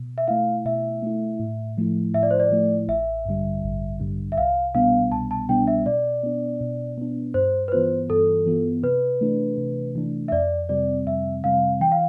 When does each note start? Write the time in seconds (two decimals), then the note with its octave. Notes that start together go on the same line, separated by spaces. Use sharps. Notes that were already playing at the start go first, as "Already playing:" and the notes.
Already playing: B2
0.18 E5
0.28 A3 E4 F5
0.65 B2 E5
1.02 A3 E4
1.40 A2
1.78 F3 A3 E4
2.14 A2 E5
2.23 D5
2.31 C5
2.40 D5
2.51 F3 A3 E4
2.88 A1 E5
3.25 G2 D3 G3
3.64 A1
4.00 G2 D3 G3
4.32 E5
4.37 C2 F5
4.75 B2 G3 B3 D4 F5
5.11 C2 A5
5.31 A5
5.49 B2 G3 B3 D4 G5
5.67 E5
5.86 B2 D5
6.23 B3 D4
6.61 B2
6.98 B3 D4
7.34 G2 C5
7.68 B4
7.72 E3 B3 F4 C5
8.10 G2 A4
8.46 E3 B3 F4
8.84 C3 B4
9.21 E3 A3 D4
9.58 C3
9.95 E3 A3 D4
10.28 E5
10.32 F2 D5
10.69 C3 G3 C4 D5
11.06 F2 E5
11.44 C3 G3 C4 F5
11.81 E3 G5
11.92 F5